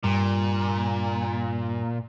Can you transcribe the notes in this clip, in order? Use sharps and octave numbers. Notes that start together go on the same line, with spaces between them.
G2 A#2